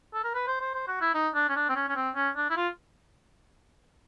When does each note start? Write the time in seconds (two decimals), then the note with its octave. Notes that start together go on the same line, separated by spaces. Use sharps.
0.14 A4
0.24 A#4
0.35 B4
0.47 C5
0.61 C5
0.74 C5
0.88 F#4
1.01 E4
1.14 D#4
1.35 D4
1.49 C#4
1.56 D4
1.69 C4
1.76 C#4
1.89 C#4
1.96 C4
2.15 C#4
2.36 D4
2.50 E4
2.57 F4